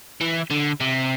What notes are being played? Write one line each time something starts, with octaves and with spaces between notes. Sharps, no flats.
E3
D3
C3